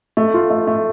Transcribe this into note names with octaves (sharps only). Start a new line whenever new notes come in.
A3
F4
A3
A3